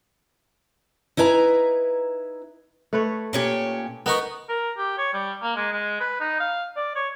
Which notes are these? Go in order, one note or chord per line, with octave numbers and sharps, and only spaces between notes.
D#4 E4 B4 G#5 A#5
A3 B4 C#5
A#2 C#4 G4
B3 D#4 A#4 B4 C#6
A#4
G4
C#5
G3
A#3
G#3
G#3
B4
D#4
F5
D5
C#5